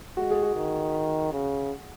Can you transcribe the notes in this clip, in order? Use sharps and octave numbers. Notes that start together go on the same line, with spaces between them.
G#3 F#4
G#4
F#4
D#3
C#3